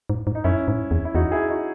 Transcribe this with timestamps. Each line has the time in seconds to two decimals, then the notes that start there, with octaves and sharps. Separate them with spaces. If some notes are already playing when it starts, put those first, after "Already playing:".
0.10 G#2
0.27 G#2
0.35 D#4
0.44 F#2 C#4 E4
0.68 G#2
0.91 E2
1.05 E4
1.15 E2 D#4 F#4
1.32 E4 G#4
1.49 D#4 F#4